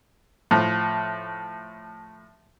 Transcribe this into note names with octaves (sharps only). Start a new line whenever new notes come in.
A2 F3